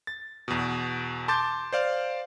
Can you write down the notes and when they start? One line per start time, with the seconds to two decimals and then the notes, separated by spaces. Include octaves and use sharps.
0.07 A6
0.48 E2 B2
1.28 A5 C6 D6 G6 A6
1.73 C5 D5 F5